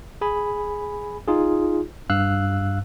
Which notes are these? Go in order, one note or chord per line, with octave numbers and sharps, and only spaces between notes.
G#4 G#5 B5
D#4 F4 G#4
G2 F5 E6 F#6